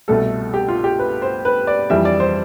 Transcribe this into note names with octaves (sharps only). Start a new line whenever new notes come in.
C2 B2 A3 A4
G4
F4
G4
B4
C5
B4
D5
F2 E3 G3 E5
D5
C5